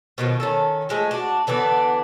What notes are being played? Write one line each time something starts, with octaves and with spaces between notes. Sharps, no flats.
B2 D#3 F3
D#3 C#4 A4
F3 G#3 A3
D4 F#4
D3 E3 B3 D4